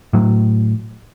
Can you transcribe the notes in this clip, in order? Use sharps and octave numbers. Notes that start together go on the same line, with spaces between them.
A2 F#3